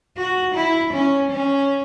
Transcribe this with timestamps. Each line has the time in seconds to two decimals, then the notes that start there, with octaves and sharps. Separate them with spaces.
0.17 F#4
0.55 E4
0.93 C#4
1.31 C#4